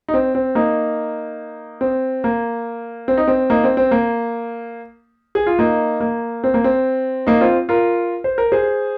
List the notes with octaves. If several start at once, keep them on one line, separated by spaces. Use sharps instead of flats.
D#4
C4
C4
A#3 D#4
C4
A#3
C4
D#4
C4
A#3 D#4
C4
C4
A#3
G#4
F4
A#3 D#4
A#3
C4
A#3
C4
A#3 D#4
C4 F4
F4 A#4
C5
A#4
G#4 C5